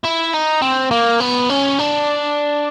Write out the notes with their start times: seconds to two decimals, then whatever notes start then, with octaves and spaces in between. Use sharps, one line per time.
0.04 E4
0.33 D#4
0.62 C4
0.91 A#3
1.20 B3
1.50 C#4
1.79 D4